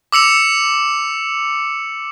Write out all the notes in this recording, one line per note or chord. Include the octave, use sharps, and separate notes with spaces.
D6 E6 C#7 F7